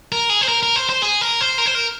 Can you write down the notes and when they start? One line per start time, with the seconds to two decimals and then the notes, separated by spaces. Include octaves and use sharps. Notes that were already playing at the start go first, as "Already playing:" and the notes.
0.12 A#4
0.30 G#4
0.41 C5
0.48 A#4
0.63 A#4
0.76 C5
0.90 C5
1.03 G#4
1.21 A#4
1.41 C5
1.58 A#4
1.66 C5
1.75 A#4